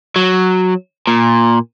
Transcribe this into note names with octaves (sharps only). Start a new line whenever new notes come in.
F#3
A#2